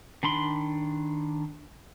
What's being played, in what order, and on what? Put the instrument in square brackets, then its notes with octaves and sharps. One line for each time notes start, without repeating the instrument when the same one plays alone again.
[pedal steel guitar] D#3 D4 B5 C6